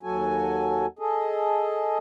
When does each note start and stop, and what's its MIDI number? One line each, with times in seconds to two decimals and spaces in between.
0.03 0.86 39
0.03 0.86 54
0.03 0.86 66
0.03 0.86 69
0.03 0.86 80
0.99 1.98 68
0.99 1.98 69
0.99 1.98 75